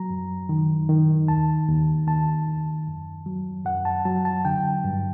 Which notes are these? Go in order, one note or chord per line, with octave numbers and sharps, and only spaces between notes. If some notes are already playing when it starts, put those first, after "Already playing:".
Already playing: F#3 A#5
F#2
D#3
D#3
D#2 A5
D#2
D#2 A5
D#2
F#2
F#3
F#2 F#5
A5
F#3 A5
A5
D3 G5
G2